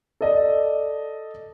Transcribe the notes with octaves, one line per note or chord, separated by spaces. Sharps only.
A4 D5 D#5